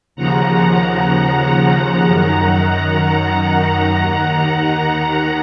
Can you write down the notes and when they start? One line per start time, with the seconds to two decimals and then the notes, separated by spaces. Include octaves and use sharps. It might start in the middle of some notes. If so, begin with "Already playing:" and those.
0.16 D#2 C#3 F3 F#5 A#5
2.06 F#2 D#3
3.01 F#5 A#5
3.95 D#2 D#3